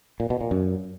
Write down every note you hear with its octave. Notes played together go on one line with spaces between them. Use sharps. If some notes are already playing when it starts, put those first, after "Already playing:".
A#2
B2
A#2
F#2